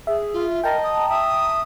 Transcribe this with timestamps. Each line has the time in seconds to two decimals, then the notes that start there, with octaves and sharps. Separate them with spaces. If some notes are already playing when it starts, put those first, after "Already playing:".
0.07 G#4 E5
0.34 F4
0.64 A#4 D#5 G5 A5 A#5
0.83 D#6
1.09 E5 D#6